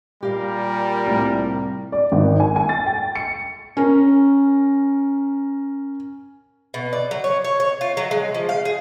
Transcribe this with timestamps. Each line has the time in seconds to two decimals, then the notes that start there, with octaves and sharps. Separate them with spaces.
0.23 A#2 G3 G4 A#4 F5
1.06 C2 A2
1.92 D5
2.12 G#1
2.40 G#5
2.56 G#5
2.69 A6
2.86 G5
3.15 C#7
3.77 C#4 A#4
6.74 B2
6.93 D5
7.11 F#3
7.24 C#5
7.44 C#5
7.60 C#5
7.81 F4
7.97 F#3
8.11 G#3
8.34 F3
8.49 F5
8.65 G#4